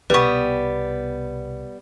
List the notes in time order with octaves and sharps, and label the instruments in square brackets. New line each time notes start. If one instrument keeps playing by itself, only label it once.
[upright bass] C2 B2 [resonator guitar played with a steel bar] G3 B3 [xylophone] B4 C#6